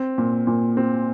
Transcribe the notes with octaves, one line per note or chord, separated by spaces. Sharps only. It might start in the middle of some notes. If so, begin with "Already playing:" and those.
Already playing: C4
A#2
A#2
C4